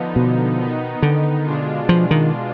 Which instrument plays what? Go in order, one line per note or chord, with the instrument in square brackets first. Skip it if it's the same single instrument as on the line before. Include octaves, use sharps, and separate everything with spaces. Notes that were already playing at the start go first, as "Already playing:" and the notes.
Already playing: [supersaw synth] D3 F3 B3 D#4
[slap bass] B2
[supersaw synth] D#3 B3 D#4
[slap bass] D3
[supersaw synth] B2 G#3 D4 F4
[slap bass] F3
D#3